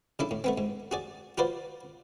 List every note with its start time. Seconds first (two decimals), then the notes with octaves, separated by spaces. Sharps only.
0.19 C#3 D4 E4 A4
0.31 A2
0.44 A3 B3 C4
0.58 G#2
0.91 F#4 G#4 D5
1.38 F4 F#4 B4 C5 D5